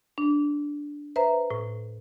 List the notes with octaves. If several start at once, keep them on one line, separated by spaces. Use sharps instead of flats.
D4
B4 C5 E5 A#5
A2